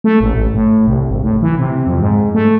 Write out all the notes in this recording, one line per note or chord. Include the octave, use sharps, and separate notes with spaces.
A3
A1
A1
A2
C2
G#1
A2
E3
C3
F2
G#2
A3